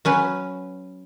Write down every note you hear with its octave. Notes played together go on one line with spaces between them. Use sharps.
F#3 C#4 B4